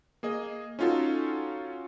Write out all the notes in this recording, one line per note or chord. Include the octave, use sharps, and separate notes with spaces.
A#3 G#4 D#5
C#4 D#4 F4 F#4 A4